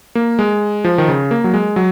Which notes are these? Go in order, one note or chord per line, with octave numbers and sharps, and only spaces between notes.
A#3
G#3
F3
D#3
C#3
A#3
F#3
G#3
F#3